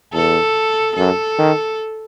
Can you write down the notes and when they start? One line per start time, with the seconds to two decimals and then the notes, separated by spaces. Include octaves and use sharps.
0.14 E2 A4
0.97 F#2 A4
1.39 D#3